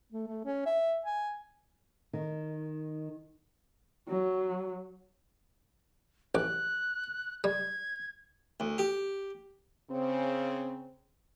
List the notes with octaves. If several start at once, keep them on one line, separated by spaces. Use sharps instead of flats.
A3
A3
C#4
E5
G#5
D#3
F#3
A1 D6 F#6
G3 G#6
D2
G4
C#3 C4